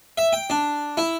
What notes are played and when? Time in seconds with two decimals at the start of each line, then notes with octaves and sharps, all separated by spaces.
0.18 E5
0.33 G5
0.50 D4
0.97 E4